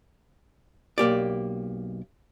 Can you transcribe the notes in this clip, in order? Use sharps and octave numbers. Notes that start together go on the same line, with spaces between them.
B1 A#3 G4 D5